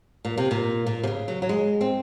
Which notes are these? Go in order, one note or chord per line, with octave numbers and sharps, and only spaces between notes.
A#2
C3
A#2
A#2
C3
C#3
F#3
F#3
G#3
C4